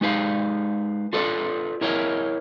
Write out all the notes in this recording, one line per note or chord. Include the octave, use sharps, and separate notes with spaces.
G#3 D#4 B4 F5
F4 A4 B4 D5
E4 A#4 C#5 D#5